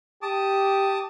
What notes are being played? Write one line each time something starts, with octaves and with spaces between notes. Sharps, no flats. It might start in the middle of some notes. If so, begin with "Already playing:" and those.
G4 A5 D6 D#6